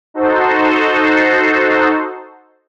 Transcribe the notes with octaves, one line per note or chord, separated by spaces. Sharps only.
D#4 F#4 A4 C5